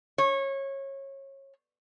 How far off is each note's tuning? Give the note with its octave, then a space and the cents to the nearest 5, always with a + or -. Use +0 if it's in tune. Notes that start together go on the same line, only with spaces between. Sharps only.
C#5 -25